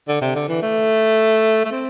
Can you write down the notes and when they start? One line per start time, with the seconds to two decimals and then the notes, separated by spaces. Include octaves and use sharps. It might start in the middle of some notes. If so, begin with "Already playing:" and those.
0.08 D3
0.21 C3
0.35 D3
0.49 E3
0.62 A3
1.65 A3
1.72 C4